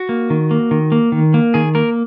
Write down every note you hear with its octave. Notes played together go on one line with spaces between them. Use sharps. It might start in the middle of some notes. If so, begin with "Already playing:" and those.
Already playing: F#4
A#3
D#3
A#3
D#3
A#3
D#3
A#3
D#3 G#4
A#3 A#4